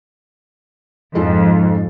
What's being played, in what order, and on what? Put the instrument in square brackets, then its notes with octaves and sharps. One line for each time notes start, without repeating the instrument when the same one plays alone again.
[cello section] F2 [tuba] G#2 [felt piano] G#3 F4 A4